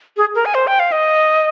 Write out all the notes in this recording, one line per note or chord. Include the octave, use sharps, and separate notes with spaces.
G#4
A#4
G#5
C5
G5
F5
D#5